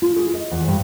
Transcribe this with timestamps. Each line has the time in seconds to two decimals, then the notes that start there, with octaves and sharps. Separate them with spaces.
0.02 F4
0.16 G#4
0.34 D#5
0.51 E2
0.68 G2